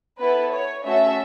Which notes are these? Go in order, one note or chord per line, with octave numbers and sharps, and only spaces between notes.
B3 E4 A4 B4
C#5
A3 C#4 F#4 A4 E5